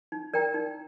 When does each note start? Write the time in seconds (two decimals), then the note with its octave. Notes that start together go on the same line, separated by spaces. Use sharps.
0.12 D#4
0.33 A#4 D5 G5 A#5
0.54 D#4